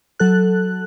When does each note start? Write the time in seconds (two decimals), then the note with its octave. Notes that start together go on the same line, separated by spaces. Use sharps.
0.19 F#3 A4 F#6